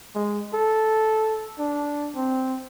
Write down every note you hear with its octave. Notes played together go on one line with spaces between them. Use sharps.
G#3
A4
D4
C4